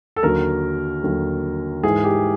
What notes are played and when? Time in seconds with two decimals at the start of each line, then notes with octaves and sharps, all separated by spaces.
0.16 A4
0.23 D#2 D3 F#3 A#4
1.04 D#2 D3 F#3
1.83 G#2 E3 G#4
2.04 G4